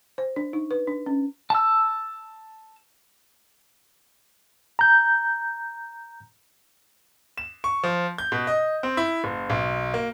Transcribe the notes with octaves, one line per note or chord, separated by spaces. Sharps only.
C5
D4
D#4
B4
D4
C#4
A5 E6
A#5 G6
E7
C#6
F3
G6
B2
D#5
C4
E4
F#1
B1
A#3